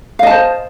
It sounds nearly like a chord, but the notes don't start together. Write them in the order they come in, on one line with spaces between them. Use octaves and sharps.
F5 D#5 A5 C5